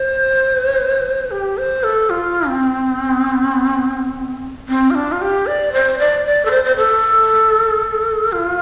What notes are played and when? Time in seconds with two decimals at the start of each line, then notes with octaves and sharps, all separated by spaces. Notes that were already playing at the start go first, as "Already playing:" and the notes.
Already playing: C5
1.31 G4
1.58 C5
1.83 A4
2.10 F4
2.48 C4
4.69 C4
4.91 F4
4.95 D4
5.12 F4
5.21 G4
5.47 D5
5.73 C5
5.99 D5
6.25 D5
6.45 A4
6.51 C5
6.64 C5
6.77 A4
8.32 F4